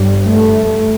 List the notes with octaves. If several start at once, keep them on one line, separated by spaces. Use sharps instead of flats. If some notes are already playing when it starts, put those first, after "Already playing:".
Already playing: G1 G2 G3
A3